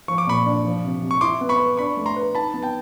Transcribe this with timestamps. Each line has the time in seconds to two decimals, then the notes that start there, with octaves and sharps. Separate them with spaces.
0.08 F3 C#6
0.18 D6
0.27 A#2 B5 C#6
0.45 D4
0.65 F3
0.84 C3
1.02 C3
1.11 C#6
1.21 E4 C6 D6
1.41 B3
1.49 B5 C#6
1.59 B4
1.77 D4 B5 C#6
1.97 A3
2.06 A#5 C6
2.16 B4
2.35 D#4 A5 B5
2.54 B3
2.63 G5 A5